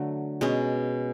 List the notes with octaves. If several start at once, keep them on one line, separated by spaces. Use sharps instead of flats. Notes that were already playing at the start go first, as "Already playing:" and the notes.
Already playing: D3 F#3 A3
B2 G#3 C#4